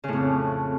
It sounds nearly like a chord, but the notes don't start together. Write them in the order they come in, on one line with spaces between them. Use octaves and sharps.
C#3 A2 F2